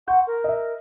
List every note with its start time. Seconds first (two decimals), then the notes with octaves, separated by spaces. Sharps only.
0.08 F#5 C6 C#6 G6
0.27 A#4
0.44 D#5 E5